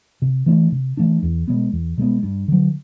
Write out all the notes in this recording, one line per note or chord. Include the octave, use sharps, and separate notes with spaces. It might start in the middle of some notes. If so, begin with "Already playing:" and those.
C3
E3 A3 D4
C3
E3 A3 D4
E2
B2 G#3 B3
E2
B2 G#3 B3
G2
D3 F#3